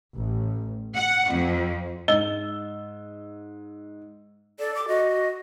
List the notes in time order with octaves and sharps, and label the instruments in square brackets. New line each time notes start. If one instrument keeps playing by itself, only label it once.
[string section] A1
F#5
F2
[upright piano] G#2 E6 G7 [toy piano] D#5
[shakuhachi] A4 [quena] D5
[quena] D6
[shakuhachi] F#4 [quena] D#5